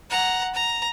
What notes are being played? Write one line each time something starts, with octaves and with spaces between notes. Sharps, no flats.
F#5 A#5
A#5